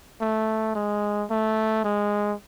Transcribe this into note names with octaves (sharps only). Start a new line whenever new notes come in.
A3
G#3
A3
G#3